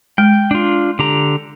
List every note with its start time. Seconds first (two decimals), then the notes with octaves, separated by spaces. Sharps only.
0.18 G#3 G5
0.51 D4 F4
0.99 D3 G4 A#5